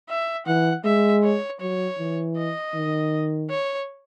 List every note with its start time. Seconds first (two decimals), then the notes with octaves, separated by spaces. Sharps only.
0.10 E5
0.46 E3 F#5
0.84 G#3 E5
1.24 C#5
1.61 F#3 C#5
1.99 E3
2.38 D#5
2.75 D#3
3.51 C#5